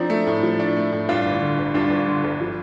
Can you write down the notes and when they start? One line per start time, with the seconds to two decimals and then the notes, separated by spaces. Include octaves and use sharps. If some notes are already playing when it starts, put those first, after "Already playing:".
Already playing: F3 C4 D4 D#4
0.10 A3
0.27 A2
0.43 F3
0.60 D4
0.77 A3
0.92 A2
1.09 G2 D4 F4
1.26 G1
1.42 D3
1.59 G1
1.74 G2 D4 F4
1.90 G1
2.08 D3
2.24 G1
2.41 F3